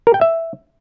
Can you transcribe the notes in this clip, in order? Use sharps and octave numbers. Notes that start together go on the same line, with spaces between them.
A#4
G5
E5